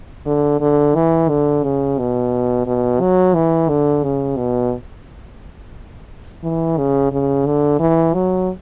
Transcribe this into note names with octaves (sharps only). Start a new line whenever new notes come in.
D3
D3
E3
D3
C#3
B2
B2
F#3
E3
D3
C#3
B2
E3
C#3
C#3
D3
E3
F#3